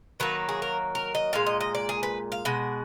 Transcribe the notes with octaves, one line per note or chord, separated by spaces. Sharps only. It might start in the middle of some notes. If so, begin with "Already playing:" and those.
D#3 F#3 A#3 B4
G#4
A#4
A#4
D#5
A#2 G#3 F5
D#5
D#5
D5
G#4
B4
F5
B2 G#3 F#5